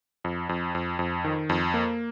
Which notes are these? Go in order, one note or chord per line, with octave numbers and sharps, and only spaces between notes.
F2
F2
F2
F2
D#3
F2
A#3